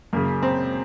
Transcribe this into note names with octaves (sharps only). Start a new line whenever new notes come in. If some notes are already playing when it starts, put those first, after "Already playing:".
F#2 C#3 A#3
C4